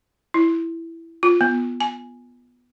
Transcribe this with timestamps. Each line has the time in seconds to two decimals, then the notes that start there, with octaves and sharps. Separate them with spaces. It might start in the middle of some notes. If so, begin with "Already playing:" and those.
0.34 E4
1.23 F4
1.41 B3
1.80 G#5